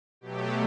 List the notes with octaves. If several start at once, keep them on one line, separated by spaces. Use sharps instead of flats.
B2 F#3 A3 G4